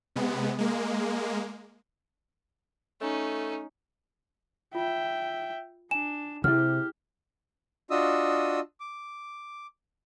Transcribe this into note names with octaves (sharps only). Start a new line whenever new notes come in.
C3 G#3 B3
G#3 A#3
A3 C#4 D#4
F4 E5 G5
D4 G#5 E7
C3 E4 G4 G#4 F6
D4 F4 F#4 D#5 D#6 E6
D6